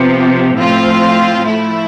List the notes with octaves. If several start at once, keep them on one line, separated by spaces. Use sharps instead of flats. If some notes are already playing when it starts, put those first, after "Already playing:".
Already playing: C3 F3 B3
A2 F3 C4 F4
F3 A3 E4